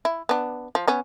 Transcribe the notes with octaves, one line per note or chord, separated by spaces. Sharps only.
E4
B3 D4
F3
B3 C#4